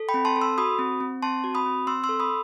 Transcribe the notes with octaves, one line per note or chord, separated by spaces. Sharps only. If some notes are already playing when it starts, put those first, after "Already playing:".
Already playing: A4
G5 B5
C4
A5 C6
A4
C6 E6
F#4 B5 D#6
C4
C4
C4 A5 C6
F#4
B5 D#6
C4
C4 C6 E6
C6 E6
A4
B5 D#6